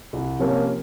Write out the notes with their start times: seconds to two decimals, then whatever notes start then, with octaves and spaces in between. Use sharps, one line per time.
0.13 C2
0.39 C3 F3 A#3 C#4